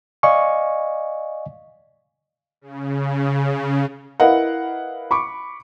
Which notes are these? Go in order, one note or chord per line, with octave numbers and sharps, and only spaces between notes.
D5 D#5 F5 G#5 C#6
C#3
E4 A#4 B4 D#5 F5 F#5
B5 C#6 D6